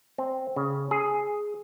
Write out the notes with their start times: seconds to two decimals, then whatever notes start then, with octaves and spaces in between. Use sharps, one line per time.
0.18 C4
0.56 C#3
0.91 G#4